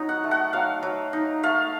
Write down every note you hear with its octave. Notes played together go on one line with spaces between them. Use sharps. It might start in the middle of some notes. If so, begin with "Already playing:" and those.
Already playing: F#3 D#4
F#5
A3
F#5
F#3 F5
F#3
D#4
A3 F5